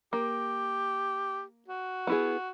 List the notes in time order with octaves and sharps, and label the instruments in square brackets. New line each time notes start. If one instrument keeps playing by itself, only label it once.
[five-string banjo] A#3 [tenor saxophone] G4
[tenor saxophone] F#4
[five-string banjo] B3 E4 G#4